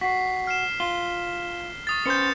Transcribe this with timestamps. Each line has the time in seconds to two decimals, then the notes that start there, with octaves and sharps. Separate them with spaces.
0.01 F#4 B6 C7
0.47 F6 C7 E7
0.80 F4 G7
1.87 C#6 D#6 A6
2.06 C#4 B4 C5 G6 C#7